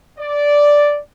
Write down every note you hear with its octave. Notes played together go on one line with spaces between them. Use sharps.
D5